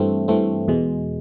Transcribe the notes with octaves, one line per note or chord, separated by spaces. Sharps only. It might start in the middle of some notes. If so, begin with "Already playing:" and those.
Already playing: G2 E3 A3 C4
G2 E3 A3 C4
E2 B2 G#3